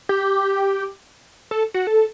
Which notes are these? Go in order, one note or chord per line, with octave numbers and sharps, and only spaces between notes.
G4
A4
F#4
A4